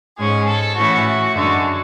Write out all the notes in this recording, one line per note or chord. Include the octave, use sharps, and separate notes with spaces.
G#2 G#3 C#4 G#4
A4
A2 E3 A3 C#4 F#4
F#2 D3 G#3 F#4